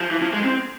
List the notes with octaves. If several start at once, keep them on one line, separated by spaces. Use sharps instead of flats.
F3
E3
F3
G#3
C4